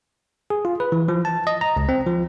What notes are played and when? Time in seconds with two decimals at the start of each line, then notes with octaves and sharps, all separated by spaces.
0.50 G#4
0.65 F4
0.80 B4
0.92 E3
1.08 F3
1.25 A5
1.47 D#5
1.61 A#5
1.76 C#2
1.89 C4
2.07 F3